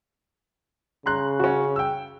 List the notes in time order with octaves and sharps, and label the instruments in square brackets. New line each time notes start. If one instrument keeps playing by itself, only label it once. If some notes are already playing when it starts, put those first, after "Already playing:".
[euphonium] C#3 [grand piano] A#5 C6 F#6
[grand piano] C#4 F#4
G5 E6